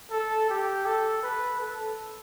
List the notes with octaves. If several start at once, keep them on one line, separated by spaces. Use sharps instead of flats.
A4
G4
A4
B4
A4